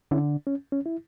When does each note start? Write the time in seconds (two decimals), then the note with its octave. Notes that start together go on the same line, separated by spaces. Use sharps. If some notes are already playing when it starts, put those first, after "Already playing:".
0.11 D3 C#4 E4
0.47 C#4
0.72 C#4
0.86 E4